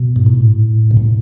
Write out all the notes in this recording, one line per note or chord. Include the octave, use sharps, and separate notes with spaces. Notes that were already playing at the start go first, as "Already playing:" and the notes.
Already playing: B2
G#2
A2
B2
A2